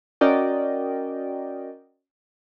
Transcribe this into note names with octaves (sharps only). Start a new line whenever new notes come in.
C#4 F#4 A#4 D5 D#5 G5